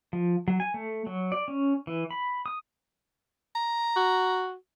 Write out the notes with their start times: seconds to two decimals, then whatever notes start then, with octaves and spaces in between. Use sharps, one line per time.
0.13 F3
0.48 F#3
0.60 G#5
0.74 A3
1.07 F#3
1.32 D5
1.48 C#4
1.87 E3
2.11 B5
2.46 D#6
3.55 A#5
3.96 F#4